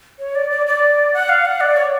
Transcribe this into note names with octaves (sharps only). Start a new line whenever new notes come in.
C#5
D5
D5
D5
F#5
F5
F#5
D5
C#5